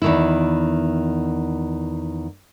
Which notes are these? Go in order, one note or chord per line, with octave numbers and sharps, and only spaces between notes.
E2 D#3 E4